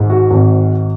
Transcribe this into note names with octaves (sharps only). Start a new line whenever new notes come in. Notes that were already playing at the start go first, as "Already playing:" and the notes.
Already playing: G#1 G#2
F#4
G#1